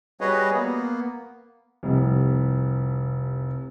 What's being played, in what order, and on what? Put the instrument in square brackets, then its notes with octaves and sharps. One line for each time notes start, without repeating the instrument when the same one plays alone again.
[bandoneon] G3 F#4 G#4 B4 C#5 D#5
A#3 B3
[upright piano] F1 C2